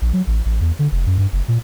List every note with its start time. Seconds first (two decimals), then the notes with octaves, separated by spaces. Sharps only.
0.01 A#1
0.13 F#3
0.27 A1
0.45 A1
0.61 E2
0.79 D3
0.92 F1
1.06 F#2
1.18 G2
1.32 F#1
1.48 A#2